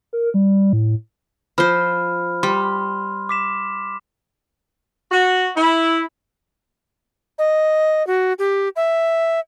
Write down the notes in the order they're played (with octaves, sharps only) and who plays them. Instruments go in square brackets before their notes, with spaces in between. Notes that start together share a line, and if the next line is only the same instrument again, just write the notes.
[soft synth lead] A#4
G3
A2
[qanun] F3 C5 [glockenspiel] B5 F6
[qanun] G3 [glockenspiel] C6
[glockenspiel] D6 B6 E7
[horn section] F#4
E4
[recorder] D#5
F#4
G4
E5